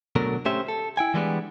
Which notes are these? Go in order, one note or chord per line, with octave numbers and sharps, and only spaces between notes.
B2 D3 F#3 A3 A#4
A3 C#4 G4 C5 E5
A4
E4 G5 G#5
E3 G3 G#3 A#3 B3 D4